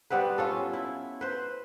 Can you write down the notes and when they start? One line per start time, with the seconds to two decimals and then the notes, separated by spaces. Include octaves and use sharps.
0.10 G3 B3 C4 B4
0.38 C#4 F4 A4
0.73 E4
1.21 B4 C5